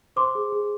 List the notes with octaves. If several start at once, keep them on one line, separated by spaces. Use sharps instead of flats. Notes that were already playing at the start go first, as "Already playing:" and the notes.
C5 C6 D6
G#4
G#4